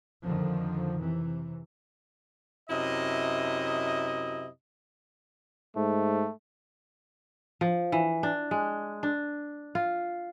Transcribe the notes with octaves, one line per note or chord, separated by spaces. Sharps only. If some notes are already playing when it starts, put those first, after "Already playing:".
F2 D3 D#3 F3
C3 E3
F#2 C3 E4 D#5
G#2 A3
F3
E3
D4
G#3
D4
F4